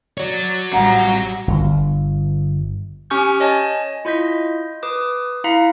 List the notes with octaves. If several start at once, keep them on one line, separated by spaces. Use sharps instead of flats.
F#4 C#5 D5
A1 C3 G3 F#5 A#5
G1
C#4 G4 G#5 C#6 F6 G6
C#5 D#5 G#5 A5
E4 F4 D#5 G6 B6
B4 D6 D#6
E4 F5 A#5 B6 C#7